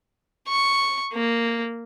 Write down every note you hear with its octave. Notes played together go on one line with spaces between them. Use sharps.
C#6
A#3